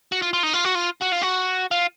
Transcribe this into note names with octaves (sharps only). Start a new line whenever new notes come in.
F#4
F4
F4
D#4
F4
F#4
F4
F#4
F4
F#4
F4